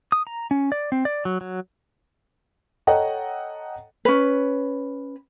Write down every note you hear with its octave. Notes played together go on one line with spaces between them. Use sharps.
D#6
A#5
C#4
D5
C4
D5
F#3
F#3
A4 C#5 D#5 F#5 G5 A#5
C#4 B4